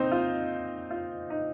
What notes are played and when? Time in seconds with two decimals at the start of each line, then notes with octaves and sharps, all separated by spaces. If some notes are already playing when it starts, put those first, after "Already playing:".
Already playing: A#2 C4 D#4 C5
0.12 F4
0.91 F4
1.30 D#4